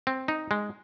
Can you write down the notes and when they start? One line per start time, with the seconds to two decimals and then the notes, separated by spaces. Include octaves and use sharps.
0.07 C4
0.28 D#4
0.51 G#3